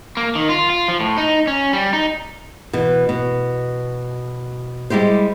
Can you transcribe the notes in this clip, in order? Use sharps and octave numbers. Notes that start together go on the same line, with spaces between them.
A#3
D#3
F4
F4
F3
A2
D#4
C#4
G3
D#4
B2 E3
B2
G3 G#3 E4 G4 C5